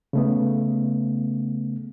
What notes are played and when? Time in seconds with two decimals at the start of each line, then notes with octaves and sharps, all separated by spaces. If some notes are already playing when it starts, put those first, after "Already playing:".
0.13 C#3 A3 B3